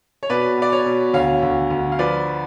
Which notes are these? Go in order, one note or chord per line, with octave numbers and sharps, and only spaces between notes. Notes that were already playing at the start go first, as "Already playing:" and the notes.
C#5
B2 B4 D5
B2 D5
C#5
B2
D2 C#5 F5
D2
D2
F5
F3 B4 D5